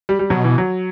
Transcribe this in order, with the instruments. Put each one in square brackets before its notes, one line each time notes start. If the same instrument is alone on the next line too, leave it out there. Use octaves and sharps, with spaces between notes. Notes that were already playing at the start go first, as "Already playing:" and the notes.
[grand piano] G3
G3
[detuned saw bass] B2 [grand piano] F#3
[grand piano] E3
F#3